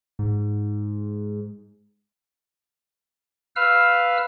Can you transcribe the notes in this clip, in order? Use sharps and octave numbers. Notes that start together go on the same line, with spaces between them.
G#2
B4 F5 E6 F6